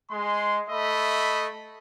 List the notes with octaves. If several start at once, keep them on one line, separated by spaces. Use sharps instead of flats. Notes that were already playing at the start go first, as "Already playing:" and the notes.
G#3 C6
A3 D#5 E5 B5